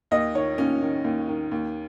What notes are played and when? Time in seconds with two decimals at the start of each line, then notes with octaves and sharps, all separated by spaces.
0.11 D#2 D#5
0.35 D#3 C#5
0.58 D#2 C#4
0.82 D#3
1.04 D#2
1.28 D#3
1.51 D#2